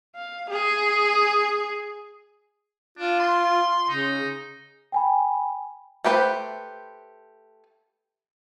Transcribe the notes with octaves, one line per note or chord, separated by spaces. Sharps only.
F5
G#4
D4 F4
C6
C#3 D#4
G5 G#5 B5
A3 G4 B4 C5